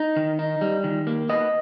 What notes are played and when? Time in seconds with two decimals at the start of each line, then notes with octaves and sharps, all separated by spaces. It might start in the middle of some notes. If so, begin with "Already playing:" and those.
Already playing: D#4
0.17 D#3
0.39 D#4
0.61 G3
0.84 D#3
1.07 A#3
1.29 B3 D#5